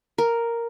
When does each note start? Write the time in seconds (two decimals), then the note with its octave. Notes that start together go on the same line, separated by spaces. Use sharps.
0.18 A#4